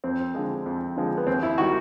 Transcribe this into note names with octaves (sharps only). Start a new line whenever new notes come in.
F2 C4
D3 F3 G#3
F2
D3 F3 G#3
B3
D#2 C4
E4
D#3 G3 F#4